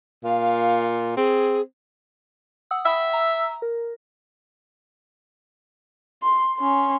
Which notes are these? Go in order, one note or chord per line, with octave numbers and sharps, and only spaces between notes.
A#2 F5
C4 G#4
F#5 D#6 E6
E5 G5 B5
A#5
A#4
C6
C#4 C6